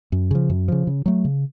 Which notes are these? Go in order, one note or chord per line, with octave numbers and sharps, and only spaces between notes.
F#2
C#3 F3
F#2
C#3 F3
C#3
F#3 A3
C#3